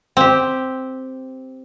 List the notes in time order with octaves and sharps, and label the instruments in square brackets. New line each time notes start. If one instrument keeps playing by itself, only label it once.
[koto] C4 G4